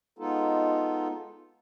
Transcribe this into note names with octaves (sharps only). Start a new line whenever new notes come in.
G#3 B3 D#4 F4 A4